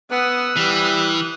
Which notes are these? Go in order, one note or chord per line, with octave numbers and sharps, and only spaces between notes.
B3 D#6 E6 F#6
E3 G3